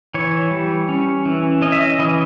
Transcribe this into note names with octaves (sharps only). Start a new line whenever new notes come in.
E3 C#5
G3
C#4
E3
C#4 D#5
E5
D#5
E3 D#5